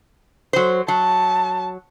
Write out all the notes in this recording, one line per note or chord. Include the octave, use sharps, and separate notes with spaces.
F#3 C5
F#3 A5